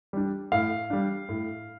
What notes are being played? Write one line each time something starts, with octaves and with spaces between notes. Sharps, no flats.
G3 D4
A2 F5
G3 D4
A2